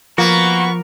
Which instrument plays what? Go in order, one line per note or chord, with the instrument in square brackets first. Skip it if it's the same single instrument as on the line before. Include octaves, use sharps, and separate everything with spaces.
[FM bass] F3 [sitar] A#3 [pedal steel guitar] B3 F#4 [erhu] C#6